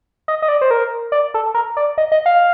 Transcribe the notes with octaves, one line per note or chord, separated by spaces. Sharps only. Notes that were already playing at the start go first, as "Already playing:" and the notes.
D#5
D#5
D5
C5
A#4
D5
A4
A#4
D5
D#5
D#5
F5